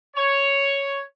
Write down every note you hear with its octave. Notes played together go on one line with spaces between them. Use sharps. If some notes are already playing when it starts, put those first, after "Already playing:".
C#5